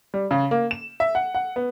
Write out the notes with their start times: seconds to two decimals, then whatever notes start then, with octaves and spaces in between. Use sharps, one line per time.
0.14 G3
0.31 C#3
0.51 A#3
0.71 E7
1.00 E5
1.15 F#5
1.35 F#5
1.56 B3